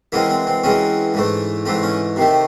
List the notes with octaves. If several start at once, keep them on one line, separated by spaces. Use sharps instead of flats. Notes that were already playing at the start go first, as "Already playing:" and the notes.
F#2 E3 G#3 C4 C#4
C4
C4
F#2 E3 G#3 C4 C#4
G#2 E3 A3
G#2 E3 A3 C4
C#4
C3 D#3 A3